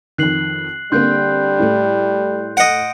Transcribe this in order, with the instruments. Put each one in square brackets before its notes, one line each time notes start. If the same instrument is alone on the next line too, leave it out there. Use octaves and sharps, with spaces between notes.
[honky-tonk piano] F2 D#3 [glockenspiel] F#6 C7 F#7
[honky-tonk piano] D3 A#3 C4 [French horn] G3 [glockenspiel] C6 F#6 G6
[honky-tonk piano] A2 A3
[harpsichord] D#5 F#5 [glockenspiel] D7